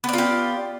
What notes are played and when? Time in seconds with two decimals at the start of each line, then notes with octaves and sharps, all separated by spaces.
0.04 B3
0.09 D5
0.13 F4
0.18 G4